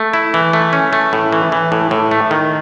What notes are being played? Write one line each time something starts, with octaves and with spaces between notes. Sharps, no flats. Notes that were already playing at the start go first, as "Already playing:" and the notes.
Already playing: A3
E4
E3
A3
C#4
A3
A2
E3
E3
A2
A2
A3
D#3